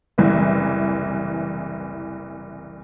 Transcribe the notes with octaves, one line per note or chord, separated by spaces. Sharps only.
F#1 C2 E3